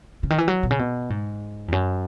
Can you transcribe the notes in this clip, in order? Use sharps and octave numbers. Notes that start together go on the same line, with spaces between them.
C#3
D#3
E3
F#3
B2
C#3
B2
G#2
E2
F#2